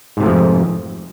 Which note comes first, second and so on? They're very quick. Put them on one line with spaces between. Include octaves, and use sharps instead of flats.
G#2 C3 A3 F3 F2